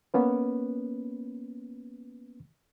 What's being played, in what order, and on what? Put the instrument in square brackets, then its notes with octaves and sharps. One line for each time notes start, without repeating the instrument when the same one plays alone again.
[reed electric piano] A#3 B3 C#4 B4